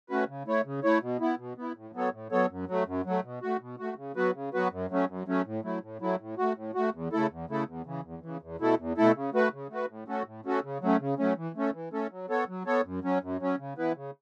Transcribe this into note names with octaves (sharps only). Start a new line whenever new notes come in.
A3 C#4 F#4 B4
C#3
A3 E4 C#5
C#3
A3 E4 C#5
B2
B3 E4
B2
B3 E4
A2
F#3 B3 A4 C#5
A2
F#3 B3 A4 C#5
F#2
F#3 A3
F#2
F#3 A3
B2
A3 F#4
B2
A3 F#4
C#3
F#3 B3 F#4 B4
C#3
F#3 B3 F#4 B4
F#2
F#3 A3 C#4
F#2
F#3 A3 C#4
A2
F#3 A3 E4
A2
F#3 A3 E4
A2
A3 F#4
A2
A3 F#4
E2
C#3 A3 E4 A4
E2
C#3 A3 E4 A4
E2
C#3 E3
E2
C#3 E3
E2
B2 A3 E4 A4
E2
B2 A3 E4 A4
C#3
A3 F#4 B4
C#3
A3 F#4 B4
A2
A3 C#4 F#4 A4
A2
A3 C#4 F#4 A4
C#3
F#3 A3 C#4
C#3
F#3 A3 C#4
E3
A3 C#4 A4
E3
A3 C#4 A4
F#3
B3 A4 C#5
F#3
B3 A4 C#5
F#2
F#3 C#4
F#2
F#3 C#4
C#3
E3 B3 E4 B4
C#3